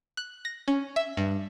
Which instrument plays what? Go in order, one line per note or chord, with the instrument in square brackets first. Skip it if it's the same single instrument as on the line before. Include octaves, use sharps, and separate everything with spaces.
[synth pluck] F#6
A#6
C#4
E5
G2